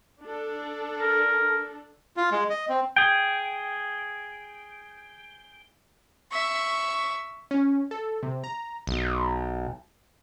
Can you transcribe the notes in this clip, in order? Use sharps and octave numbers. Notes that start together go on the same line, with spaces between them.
D4 A4
A#4
F4
G#3
D#5
C4
G#4 G5
E5 C#6
C#4
A4
C3
A#5
B1